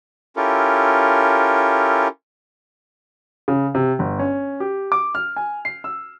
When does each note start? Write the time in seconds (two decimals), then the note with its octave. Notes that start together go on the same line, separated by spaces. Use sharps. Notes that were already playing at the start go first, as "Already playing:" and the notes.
0.36 C#4 E4 F4 G4 A4 A#4
3.48 C#3
3.75 C3
3.99 G1
4.19 C#4
4.60 G4
4.92 D6
5.15 F6
5.36 G#5
5.65 C7
5.84 E6